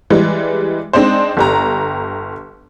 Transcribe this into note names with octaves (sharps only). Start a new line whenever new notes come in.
E3 G3 G#3
G#3 C4 D4 D#4 C5
G1 G4 A#5